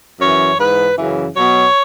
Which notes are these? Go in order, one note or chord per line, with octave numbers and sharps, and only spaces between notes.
F#2 E3 C#5
G#2 E3 B4
F#2 C#3 E3
B2 F#3 C#5